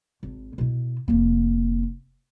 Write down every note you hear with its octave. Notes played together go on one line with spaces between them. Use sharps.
G#1
B2 E4
F1 A#3